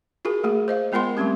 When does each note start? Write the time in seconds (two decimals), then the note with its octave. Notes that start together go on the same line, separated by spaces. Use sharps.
0.25 F4 F#4 G#4 A#4
0.43 A3 A#3 G#4
0.68 C5 D#5 F5
0.92 G#3 B3 F4 A#4 F#5 C6
1.17 G3 A3 C4 C#4 G4